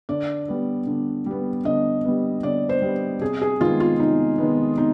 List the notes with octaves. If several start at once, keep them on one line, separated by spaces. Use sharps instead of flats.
D3 D5
G3 B3
D3
G3 B3
D3 D#5
G3 B3
D3 D5
C5
G3 B3
C3 G#4
G#4
D#3 G#3 B3 F4
F4
C3 D#4
D#3 G#3 B3
C3 D#4